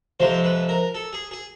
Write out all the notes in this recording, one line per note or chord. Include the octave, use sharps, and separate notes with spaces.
F2 C3 F3 G#3 C5
B4
A#4
A4
G#4
G#4